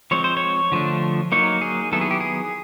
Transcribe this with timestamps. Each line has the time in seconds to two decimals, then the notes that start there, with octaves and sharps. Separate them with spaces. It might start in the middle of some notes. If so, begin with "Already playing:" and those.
0.11 F3 G#3 C4 C#5
0.24 C5
0.37 C#5
0.72 D3 F3 A3 D4
1.32 F#3 A#3 D#4 C#5
1.61 G#4
1.92 D#3 F#3 B3 E4 A4
2.01 G#4
2.11 G4
2.20 G#4